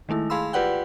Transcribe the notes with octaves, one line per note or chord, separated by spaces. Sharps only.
D#3 G#3 A3 E4
G#4 F5 B5 C6 E6
F4 G4 B4 D5 F#5 G5